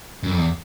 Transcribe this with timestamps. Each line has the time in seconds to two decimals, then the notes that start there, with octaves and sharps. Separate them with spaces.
0.23 F#2
0.30 F2
0.37 E2